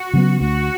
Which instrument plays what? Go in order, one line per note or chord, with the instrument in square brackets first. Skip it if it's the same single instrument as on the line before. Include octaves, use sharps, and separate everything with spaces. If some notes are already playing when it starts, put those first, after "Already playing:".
Already playing: [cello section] F#4
[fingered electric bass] C#3 F#3 B3
[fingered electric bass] D2 [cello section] F#4